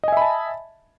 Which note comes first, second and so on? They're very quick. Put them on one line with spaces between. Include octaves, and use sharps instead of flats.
D#5 G#5 E5 B5 A5